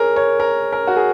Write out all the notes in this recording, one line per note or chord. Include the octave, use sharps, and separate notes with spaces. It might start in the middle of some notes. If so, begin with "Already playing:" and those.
Already playing: G#4 A#4 C#5
C#5
A#4
A#4
F#4
G#4